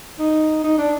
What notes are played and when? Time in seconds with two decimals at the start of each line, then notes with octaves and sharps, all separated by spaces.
0.19 D#4
0.64 D#4
0.78 D4